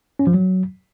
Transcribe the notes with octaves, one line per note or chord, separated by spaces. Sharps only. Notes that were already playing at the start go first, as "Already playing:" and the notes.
C#4
F3
F#3